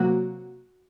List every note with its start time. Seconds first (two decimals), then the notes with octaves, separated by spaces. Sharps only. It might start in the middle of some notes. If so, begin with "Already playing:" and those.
Already playing: C3 F#3 A#3 F#4